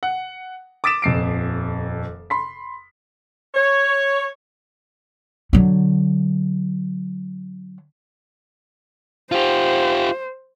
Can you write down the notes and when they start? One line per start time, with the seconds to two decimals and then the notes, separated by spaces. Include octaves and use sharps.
0.03 F#5
0.84 D6 D#6 A6 B6 D7 E7
1.02 D#1 F2 C7 D7
2.30 B5 C6 B6
3.55 C#5
5.53 D3 F#3
9.32 F4 G4 C5